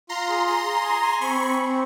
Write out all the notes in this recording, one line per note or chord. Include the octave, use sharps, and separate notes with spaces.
F4 A#5 C6
G#4
G#4 A#5 C6
G#4
G#5
G#5
C4 B5 C#6
C4
C4